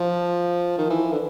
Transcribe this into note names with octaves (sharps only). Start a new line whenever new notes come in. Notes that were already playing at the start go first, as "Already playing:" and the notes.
Already playing: F3
D#3
E3
D3